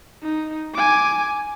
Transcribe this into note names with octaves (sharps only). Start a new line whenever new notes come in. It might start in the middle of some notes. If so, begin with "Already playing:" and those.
D#4
G#5 D6